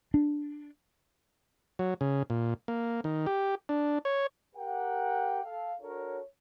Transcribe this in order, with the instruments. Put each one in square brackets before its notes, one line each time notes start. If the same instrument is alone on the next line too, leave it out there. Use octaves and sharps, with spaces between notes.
[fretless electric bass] D4
[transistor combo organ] F#3
C#3
A#2
A#3
D#3
G4
D4
C#5
[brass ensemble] G4 A#4 F#5 G5
A4 F5
D4 F#4 A4 A#4 C#5